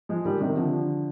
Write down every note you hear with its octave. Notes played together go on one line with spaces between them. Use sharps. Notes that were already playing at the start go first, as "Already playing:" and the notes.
F3 G#3
D#3 G3
C3 D#3
D3 F3